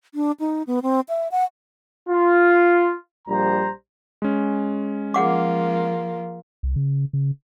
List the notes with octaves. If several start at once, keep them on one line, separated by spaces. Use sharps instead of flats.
D4
D#4
B3
C4
E5
F#5
F4
A#1 G3 C5 A#5
G#3 C#4
F3 A#3 F4 G#4 F#5 D6
C2
C#3
C#3